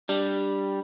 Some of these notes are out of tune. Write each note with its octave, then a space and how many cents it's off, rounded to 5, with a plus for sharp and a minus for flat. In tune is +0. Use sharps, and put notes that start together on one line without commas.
G3 +0 D4 +0